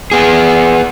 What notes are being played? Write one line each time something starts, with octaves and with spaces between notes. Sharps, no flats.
B3 G#4